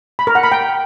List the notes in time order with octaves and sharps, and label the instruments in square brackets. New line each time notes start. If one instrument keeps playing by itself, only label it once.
[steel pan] B5
A#4
F#5
B5
G5